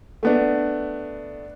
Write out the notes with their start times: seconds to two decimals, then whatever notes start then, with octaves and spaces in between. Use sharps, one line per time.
0.23 A3 B3 D4